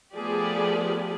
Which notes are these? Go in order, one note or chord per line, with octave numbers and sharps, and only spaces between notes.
F3 A3 B3 G4 G#4 D5